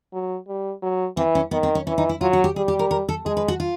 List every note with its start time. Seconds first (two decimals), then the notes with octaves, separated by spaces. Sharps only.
0.13 F#3
0.48 G3
0.82 F#3
1.17 E3 C4
1.35 C#4
1.51 D#3 B3
1.63 C4
1.75 C#4
1.87 E3 C#4
1.98 D#4
2.09 E4
2.21 F#3 F4
2.33 F#4
2.44 G4
2.56 G3 G#4
2.68 G4
2.79 A#4
2.91 A#4
3.09 A4
3.25 G#3 G#4
3.37 B4
3.48 F#4
3.60 F4